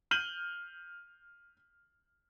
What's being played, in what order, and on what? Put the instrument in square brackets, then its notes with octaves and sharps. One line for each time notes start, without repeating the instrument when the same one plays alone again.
[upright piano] F6 G6 D#7 F#7 G7